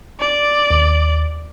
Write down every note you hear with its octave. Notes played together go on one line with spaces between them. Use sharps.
D5
D#2